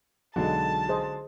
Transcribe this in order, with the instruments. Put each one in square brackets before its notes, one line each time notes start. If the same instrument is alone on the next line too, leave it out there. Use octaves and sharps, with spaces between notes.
[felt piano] B1 [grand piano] D3 F#3 G#3 [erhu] A5
[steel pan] G#4 C5 D#5